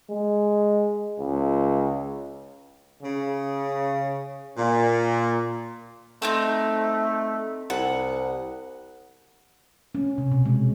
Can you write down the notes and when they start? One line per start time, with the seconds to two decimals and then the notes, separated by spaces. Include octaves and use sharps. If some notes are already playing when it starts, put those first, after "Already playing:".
0.10 G#3
1.20 C#2
3.03 C#3
4.58 A#2
6.22 A3 C4 D#4 G6
7.70 C2 F#5
9.95 C#4
10.18 C3
10.32 B2
10.45 G#3